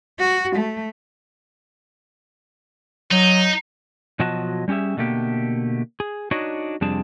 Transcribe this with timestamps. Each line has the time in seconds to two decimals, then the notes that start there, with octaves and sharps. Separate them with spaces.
0.19 F#4
0.56 A3
3.12 F#3 D#4
4.20 B2 F3 F#3 F#4 D#5 A5
4.68 G3 C#4 G4 G#4 E5
4.97 B2 D3 A3 A#3 G4
6.00 G#4
6.31 D4 D#4 F#4 C#5 D#5
6.81 F2 C3 G3 D4 G#4 A5